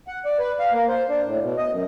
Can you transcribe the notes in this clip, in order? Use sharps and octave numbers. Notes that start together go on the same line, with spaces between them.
F#5
D5
B4
F5
A#3
C5
D4
A2
B2
D#5
F#2